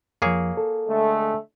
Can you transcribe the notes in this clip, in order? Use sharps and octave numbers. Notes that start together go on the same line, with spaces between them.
F2 F3 A#3 G#4 C#5
A4
D3 G#3 A3